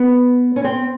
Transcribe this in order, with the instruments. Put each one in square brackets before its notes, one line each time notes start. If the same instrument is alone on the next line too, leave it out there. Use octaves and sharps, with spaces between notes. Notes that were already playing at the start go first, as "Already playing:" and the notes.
Already playing: [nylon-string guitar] B3
C#4
C4